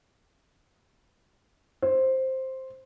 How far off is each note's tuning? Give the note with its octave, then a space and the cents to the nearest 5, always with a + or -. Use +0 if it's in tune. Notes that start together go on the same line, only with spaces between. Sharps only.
C5 +5